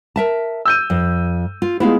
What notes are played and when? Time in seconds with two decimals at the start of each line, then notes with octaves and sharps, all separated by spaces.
0.16 A#4 E5 A5
0.65 E6 G6 D#7
0.90 F2
1.62 F4
1.80 G#3 B3 E4 F4 F5